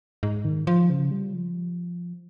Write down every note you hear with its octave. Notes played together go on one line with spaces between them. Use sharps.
G#2
D#3
F3
C#3
G3
F3